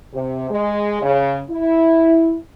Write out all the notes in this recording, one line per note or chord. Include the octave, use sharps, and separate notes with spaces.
C3
G#3
C#3
E4